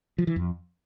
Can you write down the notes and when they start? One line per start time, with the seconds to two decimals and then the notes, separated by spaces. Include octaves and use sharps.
0.18 F3
0.27 E3
0.36 F2